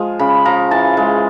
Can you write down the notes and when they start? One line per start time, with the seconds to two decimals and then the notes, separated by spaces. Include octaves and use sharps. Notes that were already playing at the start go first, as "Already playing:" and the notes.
Already playing: F3 G#3
0.19 C#3 B5
0.45 F3 A#5
0.71 E3 A5
0.97 G#3